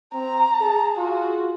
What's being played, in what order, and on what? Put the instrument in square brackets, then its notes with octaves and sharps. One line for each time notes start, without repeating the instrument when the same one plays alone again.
[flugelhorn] C4 [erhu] A#5
[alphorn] G#4 [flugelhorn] A5
[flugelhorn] F4 [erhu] F#4